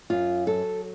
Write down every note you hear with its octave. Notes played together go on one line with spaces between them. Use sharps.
F#2 F4
F#3 A4